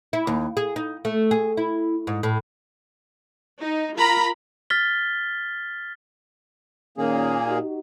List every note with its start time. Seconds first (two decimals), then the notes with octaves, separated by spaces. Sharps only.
0.13 E4
0.27 D#2
0.57 G#4
0.76 D#4
1.05 A3
1.31 G#4
1.57 E4
2.07 G#2
2.23 A2
3.60 D#4
3.96 F4 A#4 A#5 B5
4.70 F6 A6 B6 G7
6.98 A#2 D#3 A#3 C#4 G#4
7.47 D#4 F#4 G4